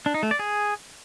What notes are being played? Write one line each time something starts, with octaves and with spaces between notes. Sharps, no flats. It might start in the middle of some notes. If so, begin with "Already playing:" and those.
D4
D#4
A3
D5
G#4